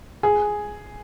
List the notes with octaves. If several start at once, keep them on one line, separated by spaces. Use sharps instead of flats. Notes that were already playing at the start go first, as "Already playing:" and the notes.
G#4